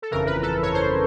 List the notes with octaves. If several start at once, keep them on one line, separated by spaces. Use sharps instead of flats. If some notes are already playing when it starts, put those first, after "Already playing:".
A4
G1 F2 C#3 E3 A#4
B4
A4
C#5
C5